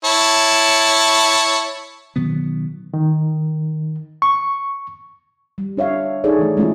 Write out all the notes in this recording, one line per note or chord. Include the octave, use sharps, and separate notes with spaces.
E4 C#5 A5
B2 D#3 F#3 B3
D#3
C#6
G3
D4 C#5 E5 F5
D#4 G#4 A4 C#5 D5
E3 A3
G#3 A3 C#4 E4 F4